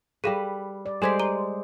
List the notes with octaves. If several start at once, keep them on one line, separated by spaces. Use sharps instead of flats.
G3 G#4 A4 B4 F5
D5
G3 G#3 A4 C5 D5 G#6 B6
A#5 D6 D#7